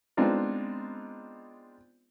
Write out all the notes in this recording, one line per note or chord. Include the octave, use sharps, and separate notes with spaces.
G#3 B3 C4 D4 D#4 F4